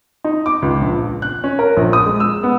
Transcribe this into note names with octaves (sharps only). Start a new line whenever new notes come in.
D#4
D6
C#2
A#1
F#6
C#4
A#4
A#1
D#6
G#3
E6
B3